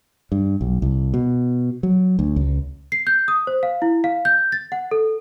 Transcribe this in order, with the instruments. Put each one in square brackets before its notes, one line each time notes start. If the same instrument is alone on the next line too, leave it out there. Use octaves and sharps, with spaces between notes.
[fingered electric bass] G2
B1
C2
B2
F#3
D2
C#2
[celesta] C7
G6
D#6
C5
F5
E4
F5
G6
A6
F#5
A4